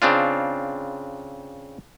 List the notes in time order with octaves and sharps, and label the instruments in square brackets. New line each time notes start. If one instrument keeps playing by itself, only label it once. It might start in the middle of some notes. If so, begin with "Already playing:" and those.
[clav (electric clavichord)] C#3 C4 D4 F4